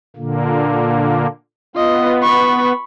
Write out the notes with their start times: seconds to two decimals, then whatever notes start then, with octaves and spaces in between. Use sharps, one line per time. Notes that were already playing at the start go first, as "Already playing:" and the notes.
0.16 A#2 D3 A#3
1.76 B3 F4 D#5
2.23 B5 C#6